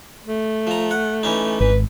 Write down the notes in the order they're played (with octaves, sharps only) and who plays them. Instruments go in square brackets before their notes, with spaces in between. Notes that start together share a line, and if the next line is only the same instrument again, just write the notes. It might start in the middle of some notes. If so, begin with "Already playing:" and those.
[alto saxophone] A3
[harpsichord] F3 A#5
F#5
E3 C#4 D#4
[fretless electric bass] G#1 [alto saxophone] B4